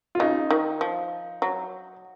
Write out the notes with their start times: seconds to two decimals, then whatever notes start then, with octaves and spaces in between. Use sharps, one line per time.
0.15 F4
0.19 C#3 D#4
0.51 D#3
0.81 F3
1.42 F#3